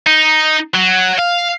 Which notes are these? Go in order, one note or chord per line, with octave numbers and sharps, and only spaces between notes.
D#4
F#3
F5